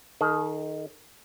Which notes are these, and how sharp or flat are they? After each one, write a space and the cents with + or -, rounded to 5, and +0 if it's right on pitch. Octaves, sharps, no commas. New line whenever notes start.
D#3 +0 A4 -45